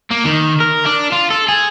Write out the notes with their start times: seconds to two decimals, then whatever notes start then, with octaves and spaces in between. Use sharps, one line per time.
0.11 A#3
0.25 D#3
0.60 A#4
0.86 D4
1.12 F4
1.30 A4
1.49 G#4